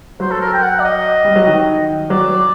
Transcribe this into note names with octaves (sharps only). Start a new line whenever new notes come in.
F#3 C5
A4
A#4
G5
F#5
D5
D#5
G3
F#3
D#3
F#3 D5